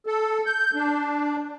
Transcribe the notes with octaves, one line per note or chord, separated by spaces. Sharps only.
A4
G6
D4